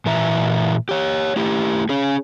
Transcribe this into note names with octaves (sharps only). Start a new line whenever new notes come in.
A#2 E3 E5 A#5
G4 C#5
A3 E4 G4
C#4 G#4